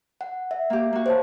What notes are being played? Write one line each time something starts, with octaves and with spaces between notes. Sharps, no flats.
F#5
E5
A#3 G4
A#3 F#4
C5 C#5 A5